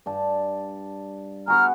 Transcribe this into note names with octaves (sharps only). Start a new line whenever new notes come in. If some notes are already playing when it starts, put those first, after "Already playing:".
G2 D5 A5
B3 F#4 G#4 A#5 F6